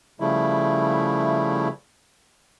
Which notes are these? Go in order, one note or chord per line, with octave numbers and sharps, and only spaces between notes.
C#3 F3 G3 A3 E4